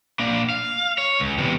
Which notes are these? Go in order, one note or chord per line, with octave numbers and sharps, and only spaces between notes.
A#3 D4
F5
C#5
C#2
E2 C3